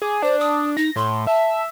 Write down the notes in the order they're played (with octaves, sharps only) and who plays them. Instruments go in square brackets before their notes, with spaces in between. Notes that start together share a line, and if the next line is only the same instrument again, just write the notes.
[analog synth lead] G#4 [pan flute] D6
[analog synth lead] D4 [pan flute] C5
[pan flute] D#6
[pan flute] D#4 [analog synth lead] A#6
[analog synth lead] A2 [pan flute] C6
[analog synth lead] E5 [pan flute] A5